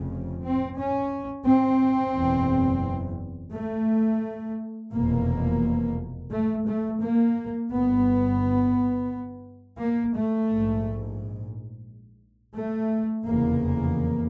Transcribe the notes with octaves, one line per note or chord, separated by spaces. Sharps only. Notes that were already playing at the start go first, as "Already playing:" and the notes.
Already playing: F1 F2 C#3
C4
C#4
C4
F#1 E2 B2
A3
F1 E2 B2 A#3
A3
A3
A#3
G1 G2 B3
A#3
A3
A#1 G#2
A3
F1 E2 C#3 A#3